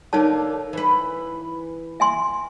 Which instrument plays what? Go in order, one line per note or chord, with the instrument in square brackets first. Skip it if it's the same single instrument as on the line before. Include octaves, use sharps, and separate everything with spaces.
[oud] D3 A#3 [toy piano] D#4 C#5 A5
[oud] E3 B4
[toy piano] E5 G#5 C6